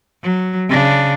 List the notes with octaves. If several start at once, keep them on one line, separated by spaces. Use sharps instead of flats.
F#3
C#3 D4